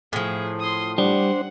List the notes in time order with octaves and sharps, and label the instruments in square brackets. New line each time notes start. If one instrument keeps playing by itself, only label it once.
[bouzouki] A2 F3 [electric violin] G#4
[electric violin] C6 D#6
[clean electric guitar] G3 [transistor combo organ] D4 C5 [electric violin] F#5